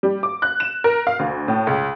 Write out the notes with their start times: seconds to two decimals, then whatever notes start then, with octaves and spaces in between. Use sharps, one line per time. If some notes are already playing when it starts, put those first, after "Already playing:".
0.03 G3
0.23 D6
0.42 F#6
0.60 E7
0.84 A#4
1.07 F5
1.19 D2
1.48 A2
1.67 C#2